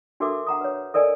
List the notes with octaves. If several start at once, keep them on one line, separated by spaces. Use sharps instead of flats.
D4 F#4 A4 A#4 E5 D6
F#5 A#5 D#6
B4 C#5
A4 A#4 D5 D#5 G#5